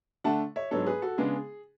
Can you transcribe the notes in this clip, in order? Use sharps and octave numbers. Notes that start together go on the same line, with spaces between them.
D3 A3 D4 F#5 A5
C#5 E5
G#2 F#3 B3 D4 A4 C#5
G#4 B4
F#4 A4
C#3 G#3 B3 D4 G#4